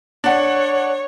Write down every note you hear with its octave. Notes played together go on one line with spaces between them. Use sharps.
D4 C#5 F#5